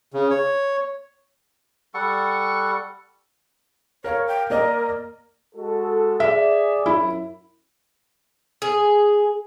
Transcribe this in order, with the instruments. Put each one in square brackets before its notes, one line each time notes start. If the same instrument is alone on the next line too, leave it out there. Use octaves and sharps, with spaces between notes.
[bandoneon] C#3
C#5
[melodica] G3 A4 F#5 C#6
[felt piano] A#4 F5 [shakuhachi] C#5
[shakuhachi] G5
[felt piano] A#3 D5 D#5 [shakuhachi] A#4
[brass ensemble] G#3 F#4 A4
[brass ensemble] G#4 D5 [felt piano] E5
[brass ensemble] F#2 [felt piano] E4
[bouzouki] G#4